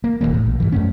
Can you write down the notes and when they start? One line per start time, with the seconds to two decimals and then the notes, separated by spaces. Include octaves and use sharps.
0.04 A#3
0.21 E1 D#2 E3 A#3
0.34 A2
0.47 A#1
0.60 G2 E3
0.72 F#2 A3 C#4